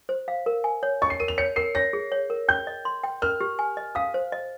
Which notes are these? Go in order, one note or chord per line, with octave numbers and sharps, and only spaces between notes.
C5
F5
A#4
G#5
C#5
D#5 C#6
C7
A#4 D#7
F7
C#5 C#7
A#4 C7
C#5 A#6
G#4
C#5
A#4
G5 G6
D#5
C6
G5
A#4 F6
G4
G#5
D#5
F5 D#6
C5
D#5